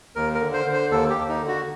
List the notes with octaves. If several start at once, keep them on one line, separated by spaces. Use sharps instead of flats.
D#2 A#4
A#4
D3
C5
D3
C5
D#2 A4
G4
D#2
D#4
D3
F#4